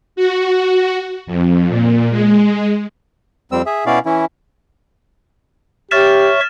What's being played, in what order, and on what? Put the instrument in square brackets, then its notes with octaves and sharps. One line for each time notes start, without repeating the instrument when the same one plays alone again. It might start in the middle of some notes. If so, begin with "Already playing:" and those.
[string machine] F#4
F2
A#2
G#3
[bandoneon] F2 G3 C4 E6
G#4 E5
B2 C#4 E4 F#4 D5 F5
E3 C#4 E4
[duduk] G4 [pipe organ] C#5 E5 C#6 [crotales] F6 A6 E7